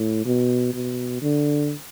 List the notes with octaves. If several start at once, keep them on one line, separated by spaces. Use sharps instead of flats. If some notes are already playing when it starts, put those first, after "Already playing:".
Already playing: A2
B2
B2
D3